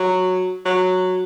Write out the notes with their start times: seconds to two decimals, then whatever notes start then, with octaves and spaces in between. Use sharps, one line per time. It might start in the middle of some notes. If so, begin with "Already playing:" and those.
Already playing: F#3
0.66 F#3